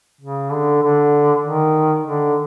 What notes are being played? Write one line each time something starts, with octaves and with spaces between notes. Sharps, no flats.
C#3
D3
D3
D#3
D3